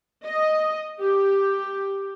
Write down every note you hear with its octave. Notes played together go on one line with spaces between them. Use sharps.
D#5
G4